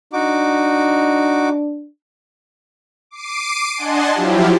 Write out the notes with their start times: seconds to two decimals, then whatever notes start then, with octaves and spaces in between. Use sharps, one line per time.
0.13 D4 D#4 F#4 D6
3.11 D6 C7 D7 D#7
3.76 D4 D#5 F#5 G#5 A5 C6
4.14 F3 F#3 E4 F4 G4